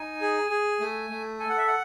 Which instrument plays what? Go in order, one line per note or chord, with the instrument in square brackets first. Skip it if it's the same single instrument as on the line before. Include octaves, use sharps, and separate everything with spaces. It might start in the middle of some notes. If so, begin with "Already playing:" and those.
Already playing: [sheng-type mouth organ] D#4 G#5
G#4
G#4
A3
A3
A4 G#5
F#5
E5
F#5